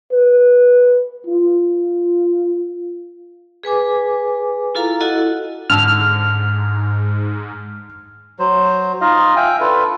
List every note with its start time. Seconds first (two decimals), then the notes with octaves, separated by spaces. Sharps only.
0.12 B4
1.27 F4
3.63 G#4 B4 G#5 D6
4.75 E4 F4 A4 F5 A#5
5.00 E4 F#4 A4 D#5 F#5
5.70 G#2 D3 A5 E6 F6
8.39 F#3 C5
9.01 D#4 F4 D#5 F5
9.36 E5 F5 G5 G#5
9.60 D4 F4 A4 B4